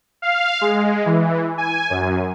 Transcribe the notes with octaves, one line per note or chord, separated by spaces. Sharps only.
F5
G#3
E3
G#5
F#2